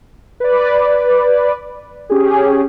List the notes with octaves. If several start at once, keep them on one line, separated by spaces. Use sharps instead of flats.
B4 D5
C#4 G4 G#4